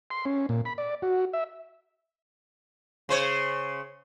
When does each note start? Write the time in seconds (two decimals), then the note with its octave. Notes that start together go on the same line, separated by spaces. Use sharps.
0.11 C6
0.25 C#4
0.49 A#2
0.65 B5
0.78 D5
1.02 F#4
1.33 E5
3.09 C#3 C5 C#5